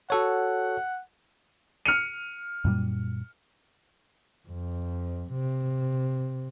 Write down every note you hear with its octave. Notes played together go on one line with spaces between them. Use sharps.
F#4 A4 C#5 F#5
F6 C#7 D#7
F#2 A#2 G3
F2
C3